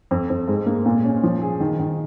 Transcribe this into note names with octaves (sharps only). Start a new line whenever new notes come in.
F2
F2
G#2
A#3
A#2
C#4
F3
G#4
D#3
D#3